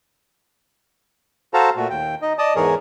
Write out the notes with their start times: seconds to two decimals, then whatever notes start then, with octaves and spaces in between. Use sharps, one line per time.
1.54 F#4 A4 C5 F5 A5 A#5
1.77 A#2 A3 F#4
1.90 D#2 G5
2.22 D#4 D#5
2.38 D5 D#5 A5 D#6
2.56 E2 G#2 E3 G#4 A#4 C#5